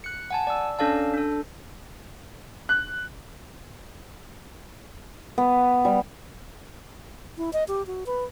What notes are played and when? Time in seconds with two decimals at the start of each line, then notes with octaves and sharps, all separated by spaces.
0.04 F#6 C#7
0.31 F#5 G#5 A5
0.47 D5 E6
0.79 C#4 D4 A4 D5 F5 A5
1.14 D4 A4
2.69 F#6
5.38 B3
5.85 G3
7.37 E4
7.53 D#5
7.68 G4
7.87 F#4
8.06 B4